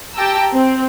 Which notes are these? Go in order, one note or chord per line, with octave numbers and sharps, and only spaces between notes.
G4 G5 A5 A#5 E6
C4